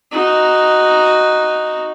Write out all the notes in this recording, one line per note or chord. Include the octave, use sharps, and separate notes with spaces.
D#4 F#4